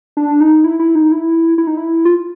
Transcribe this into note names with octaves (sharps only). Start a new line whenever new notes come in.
D4
D#4
E4
E4
D#4
E4
E4
D#4
E4
F4